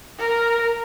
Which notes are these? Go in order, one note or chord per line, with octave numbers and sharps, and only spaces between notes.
A#4